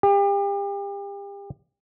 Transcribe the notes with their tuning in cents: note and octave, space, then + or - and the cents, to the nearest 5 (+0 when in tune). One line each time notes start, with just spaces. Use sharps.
G4 +35